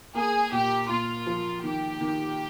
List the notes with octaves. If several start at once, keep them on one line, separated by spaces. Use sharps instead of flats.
A#3 G#4
A#2 G4
A#2 F4
F3
D#3 G4
D#3